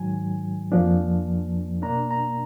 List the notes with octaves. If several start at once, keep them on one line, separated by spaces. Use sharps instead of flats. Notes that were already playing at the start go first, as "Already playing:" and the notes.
Already playing: G#2 D#3 F#3 G#5
F2 F3 A#3 D4
B2 A#3 D4 A#5
A#5